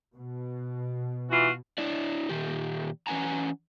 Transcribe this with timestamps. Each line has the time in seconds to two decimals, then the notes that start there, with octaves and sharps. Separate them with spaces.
0.15 B2
1.31 E3 F4 F#4
1.78 D4 E4 D5
2.29 A#2 D#3 G4
3.07 E3 C#4 B4 F#5 G#5 A#5